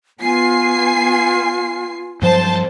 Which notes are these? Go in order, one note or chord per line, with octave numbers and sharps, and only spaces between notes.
B3 F4 G#5 C7
G2 F3 F#3 C5 A5